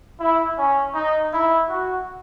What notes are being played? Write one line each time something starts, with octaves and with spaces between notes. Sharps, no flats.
E4
C#4
D#4
E4
F#4